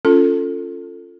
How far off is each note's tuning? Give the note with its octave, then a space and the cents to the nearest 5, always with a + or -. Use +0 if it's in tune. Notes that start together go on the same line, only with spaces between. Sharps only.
C#4 +0 F4 +0 A4 +15